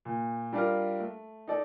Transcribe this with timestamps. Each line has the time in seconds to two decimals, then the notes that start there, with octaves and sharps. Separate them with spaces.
0.05 A#2
0.53 G3 D4 F4 A#4
1.00 A3
1.48 D#4 A4 D5